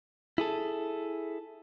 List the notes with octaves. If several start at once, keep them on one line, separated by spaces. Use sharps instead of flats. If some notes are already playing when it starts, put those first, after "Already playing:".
E4 G#4 A4